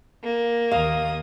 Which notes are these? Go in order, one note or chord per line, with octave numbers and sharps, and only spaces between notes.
A#3
D#2 F5 D#6